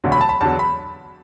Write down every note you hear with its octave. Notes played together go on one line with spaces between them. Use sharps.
E1 D2 D3 F#3
B5
A5
B5
E2 D3 F#3 A5
B5